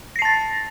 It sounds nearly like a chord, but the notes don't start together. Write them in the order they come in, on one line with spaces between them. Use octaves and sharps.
A#6 C7 A5 A6